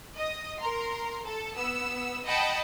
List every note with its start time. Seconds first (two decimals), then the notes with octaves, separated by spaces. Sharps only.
0.16 D#5 D#6
0.58 A#4 A#5 C6
1.25 A4
1.55 B3 E6
2.25 D#5 F#5 G5 A5 B5 C#7